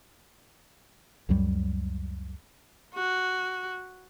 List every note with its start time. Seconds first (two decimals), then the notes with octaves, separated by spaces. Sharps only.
1.29 C#2 F#2 F#3 G3
2.94 F#4